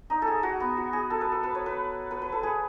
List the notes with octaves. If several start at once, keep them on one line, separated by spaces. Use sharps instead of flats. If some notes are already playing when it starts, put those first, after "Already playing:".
D#4
A4
G#4
F#4
B3
F#4
G#4
A4
B4
A4
B4
C#5
B4
B4
B4
A4
G#4